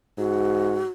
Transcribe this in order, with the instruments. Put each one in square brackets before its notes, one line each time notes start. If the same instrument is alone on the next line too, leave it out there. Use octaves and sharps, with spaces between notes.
[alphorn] G#2 [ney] F#4